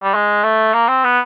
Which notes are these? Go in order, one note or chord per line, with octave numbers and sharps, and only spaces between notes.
G3
G#3
A3
A#3
C4
B3